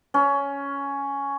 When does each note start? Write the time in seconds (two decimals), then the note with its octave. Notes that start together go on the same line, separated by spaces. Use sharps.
0.14 C#4